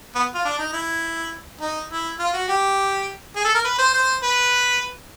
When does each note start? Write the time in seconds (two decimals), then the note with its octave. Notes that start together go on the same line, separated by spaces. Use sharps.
0.15 B3
0.34 F4
0.45 D4
0.59 D#4
0.73 E4
1.61 D#4
1.90 E4
2.19 F4
2.33 F#4
2.48 G4
3.36 G#4
3.45 A4
3.55 A#4
3.65 B4
3.78 C5
3.94 C5
4.23 B4